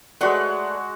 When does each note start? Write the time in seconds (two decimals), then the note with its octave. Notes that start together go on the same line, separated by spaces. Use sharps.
0.21 G#3 A3 D4 F#4 B4 F#5